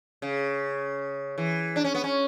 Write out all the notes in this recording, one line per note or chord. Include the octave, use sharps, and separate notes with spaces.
C#3
E3
D4
C#4
B3
C#4